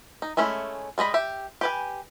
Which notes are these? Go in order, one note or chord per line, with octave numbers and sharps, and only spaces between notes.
D#4
G#3 A3 C#4 E4
G3 G#3 D#5 B5
G4 E5
G4 B4 G#5